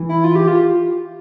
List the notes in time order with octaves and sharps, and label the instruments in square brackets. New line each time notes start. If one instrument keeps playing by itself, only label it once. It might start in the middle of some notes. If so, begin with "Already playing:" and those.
Already playing: [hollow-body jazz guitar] E3
[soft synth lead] E4
F4
G4
F4